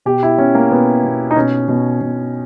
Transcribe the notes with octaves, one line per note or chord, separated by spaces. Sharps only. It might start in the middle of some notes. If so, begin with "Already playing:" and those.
B2 G4
E4
B2 C#4
A#3
B2 B3
B2
D#4
B2 C#4
B2
B2